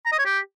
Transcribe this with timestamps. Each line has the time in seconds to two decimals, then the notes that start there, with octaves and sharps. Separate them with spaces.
0.06 A#5
0.12 D#5
0.19 C#5
0.25 G4